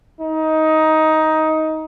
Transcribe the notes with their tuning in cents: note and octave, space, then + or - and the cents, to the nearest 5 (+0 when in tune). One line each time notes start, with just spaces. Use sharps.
D#4 +15